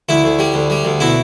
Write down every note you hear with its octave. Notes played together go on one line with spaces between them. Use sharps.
D2 E4
D2
G3
D2
G3
D2
B2 E4